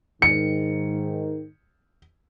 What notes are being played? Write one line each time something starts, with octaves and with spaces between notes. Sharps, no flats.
G#2 D#3 C#7